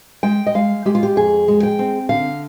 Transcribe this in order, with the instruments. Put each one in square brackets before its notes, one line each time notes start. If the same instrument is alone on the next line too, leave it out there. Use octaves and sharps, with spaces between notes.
[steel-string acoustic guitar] G#3 G5
D#5
G#3 F5
G#3 G4
F4
G4
F2 G#4
G#3
G5
C4
D3 F5